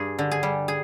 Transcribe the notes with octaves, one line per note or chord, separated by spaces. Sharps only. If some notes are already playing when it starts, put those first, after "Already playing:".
Already playing: G2 G#4
D3
G#4
G3
G#4